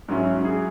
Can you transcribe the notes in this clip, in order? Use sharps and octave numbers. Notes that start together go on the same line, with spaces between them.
G#2 F#3 C#4 E4
G#4